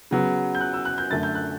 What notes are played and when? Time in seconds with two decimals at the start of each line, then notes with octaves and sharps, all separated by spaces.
0.11 C#3 F#3 B3
0.55 G6
0.61 F#6
0.74 E6
0.85 F#6
0.98 G6
1.10 F#2 D3 A3 A6
1.23 G6
1.35 F#6